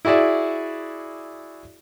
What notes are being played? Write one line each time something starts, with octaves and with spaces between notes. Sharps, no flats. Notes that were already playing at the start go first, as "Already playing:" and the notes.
E4 F#4 G#4 D5 E5